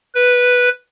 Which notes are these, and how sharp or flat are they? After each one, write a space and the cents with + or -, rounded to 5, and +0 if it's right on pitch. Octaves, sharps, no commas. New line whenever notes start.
B4 -5